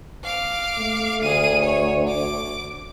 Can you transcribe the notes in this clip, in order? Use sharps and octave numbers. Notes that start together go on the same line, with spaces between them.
F5 D6
A3
D2 G#4 D#7
C#5
D6